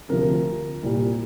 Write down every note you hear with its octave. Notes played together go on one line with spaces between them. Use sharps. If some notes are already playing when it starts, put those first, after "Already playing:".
D2 C3 F3 A#4
C2 A#2 G3